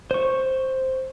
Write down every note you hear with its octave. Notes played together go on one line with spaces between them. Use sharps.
C5 C#6